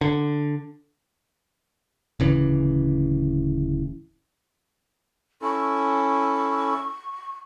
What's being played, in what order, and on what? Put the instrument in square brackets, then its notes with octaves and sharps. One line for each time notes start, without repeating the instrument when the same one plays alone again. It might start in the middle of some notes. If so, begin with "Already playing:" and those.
[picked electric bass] D3
D1 C#3 E3
[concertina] C#4 E4 A4 [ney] C#6